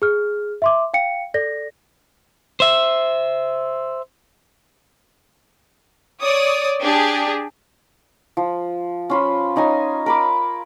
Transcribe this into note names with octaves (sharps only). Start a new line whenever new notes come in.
G#4 F6
E5 C6 D6
F5 G5 C#7
A4 D5 A#6
C5 E5
C#5 D5 D#6
D4 G4 G#4
F3
C#4 F4 B5
C#4 D#4 D#5 G#5
A#4 B5 D6